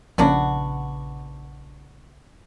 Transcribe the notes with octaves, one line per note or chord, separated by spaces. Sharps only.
A#1 C#3 F3 A#3 B3 C#4 D4 F#4